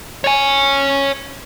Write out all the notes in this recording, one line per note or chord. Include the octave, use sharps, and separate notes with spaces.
C#5 G#5